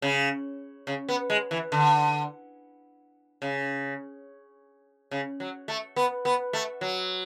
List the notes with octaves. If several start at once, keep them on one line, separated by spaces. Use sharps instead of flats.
C#3
C#3
B3
G#3
E3
D3
C#3
C#3
F#3
A3
B3
B3
A3
F#3